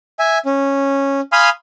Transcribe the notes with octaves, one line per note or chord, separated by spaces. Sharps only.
E5 G#5
C#4
F5 G#5 B5 C6 D#6 F6